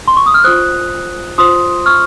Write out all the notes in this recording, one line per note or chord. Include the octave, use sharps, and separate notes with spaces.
C6
C#6
D#6
F6
F4 C5 D#6 F#6
F4 C5 C6 D#6
C#6 F6